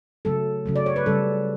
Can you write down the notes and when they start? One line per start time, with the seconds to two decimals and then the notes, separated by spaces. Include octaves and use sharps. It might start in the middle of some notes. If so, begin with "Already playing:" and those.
0.25 C#3 F#3 A3 A4
0.66 C#3 F#3 A3
0.76 D5
0.86 C#5
0.96 B4
1.06 C#3 G3 A4